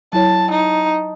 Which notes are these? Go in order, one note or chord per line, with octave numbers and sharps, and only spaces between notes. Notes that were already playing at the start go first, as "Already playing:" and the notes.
F#3 E4 C#5 A5
D#4